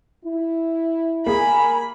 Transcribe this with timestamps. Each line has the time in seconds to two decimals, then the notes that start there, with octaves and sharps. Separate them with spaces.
0.25 E4
1.26 A#3 G#4 A#4 G#5 B5